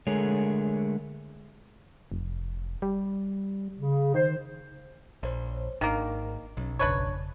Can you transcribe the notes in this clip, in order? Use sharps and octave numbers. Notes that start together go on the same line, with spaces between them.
D3 G#3 A3 G#4 A#4 C#5
F1
G3
C#3
D#3 C5
A#1 C5 C#5
G#1 D#3 A#3 D4
B1 F#3 C#4
G1 F2 C#3 D4 B4 C#5